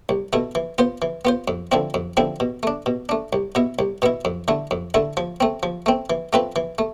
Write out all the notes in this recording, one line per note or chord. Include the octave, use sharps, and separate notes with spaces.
C2
B2 A3 E4
E3
B3 F4 C5
E3
B3 F4 C5
F2
D3 F3 C4 E4
F2
D3 F3 C4 E4
B2
A3 D4
B2
A3 D4
C2
B2 B3 E4
C2
B2 B3 E4
F2
D3 A3 E4
F2
D3 A3 E4
F3
A3 C4
F3
A3 C4
E3
A3 C4 F4 B4
E3
A3